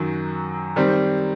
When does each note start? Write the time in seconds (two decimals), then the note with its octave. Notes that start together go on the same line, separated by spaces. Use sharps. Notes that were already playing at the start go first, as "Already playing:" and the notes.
Already playing: F#2 D#3 F#3
0.76 D#3 G3 C4